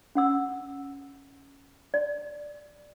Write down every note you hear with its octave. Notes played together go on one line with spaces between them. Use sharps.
C#4 F#5 E6
D5